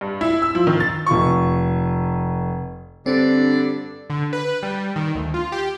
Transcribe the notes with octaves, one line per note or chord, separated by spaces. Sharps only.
G2
E4
E6
F3
D#3
A6
F1 F4 C#6
G2 D3 C4 D5
D3
B4
G3
D#3
D2
F4
G4